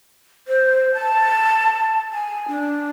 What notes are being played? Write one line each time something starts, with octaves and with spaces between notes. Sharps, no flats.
C5
A5
G#5
D4